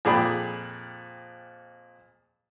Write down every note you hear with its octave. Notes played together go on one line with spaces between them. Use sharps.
F2 A#2 G#4 D5 G5 B5